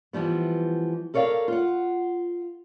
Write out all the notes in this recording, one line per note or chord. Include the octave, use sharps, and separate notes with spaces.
E3 F3 G3 B3
A4 A#4 C#5 D5 F5
F4 F#5